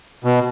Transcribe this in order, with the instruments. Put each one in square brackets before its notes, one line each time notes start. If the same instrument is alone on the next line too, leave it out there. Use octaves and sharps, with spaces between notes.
[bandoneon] B2